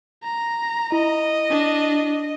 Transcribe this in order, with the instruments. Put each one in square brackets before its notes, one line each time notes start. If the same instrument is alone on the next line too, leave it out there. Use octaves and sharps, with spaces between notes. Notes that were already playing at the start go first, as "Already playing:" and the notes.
[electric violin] A#5
[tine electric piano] E4 [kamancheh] D#5
[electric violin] D4